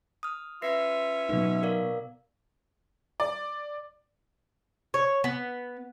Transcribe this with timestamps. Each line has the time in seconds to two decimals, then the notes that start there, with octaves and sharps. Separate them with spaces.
0.23 D#6 F6
0.62 C#4 F4 B4 E5 A#6 C7
1.29 B2 F#3 D#4
1.63 A#4 D5 F5
3.20 D5
4.94 C#5
5.24 B3